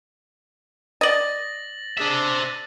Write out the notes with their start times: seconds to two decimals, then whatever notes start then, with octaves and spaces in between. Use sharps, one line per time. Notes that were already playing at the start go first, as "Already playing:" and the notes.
1.01 D5 D#5 A6 A#6 F#7
1.97 C4 D4 G#4 E5